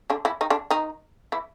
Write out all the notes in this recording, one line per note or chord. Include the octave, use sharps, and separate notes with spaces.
D3 D4
E3 E4
D#3 D#4
D3 D4
D#3 D#4
E3 E4